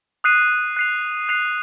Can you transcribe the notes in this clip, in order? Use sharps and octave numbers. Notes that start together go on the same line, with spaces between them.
D#6 F#6 C7 D#7
F#6 C7 F7
F#6 C7 F7